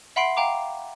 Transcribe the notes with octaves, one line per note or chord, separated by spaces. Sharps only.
E5 F#5 B5 C6 C7 D7
F5 G5 A#5 D6